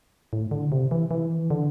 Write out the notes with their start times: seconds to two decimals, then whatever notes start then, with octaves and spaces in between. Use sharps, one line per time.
0.33 A2
0.51 D3
0.72 C3
0.91 E3
1.11 E3
1.50 D3